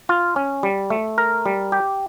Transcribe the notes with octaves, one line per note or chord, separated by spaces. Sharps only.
F4
C#4
G3
A3
A#4
G3
G4